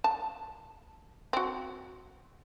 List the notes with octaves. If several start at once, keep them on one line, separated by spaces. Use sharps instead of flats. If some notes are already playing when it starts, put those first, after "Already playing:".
A5
C4 F#4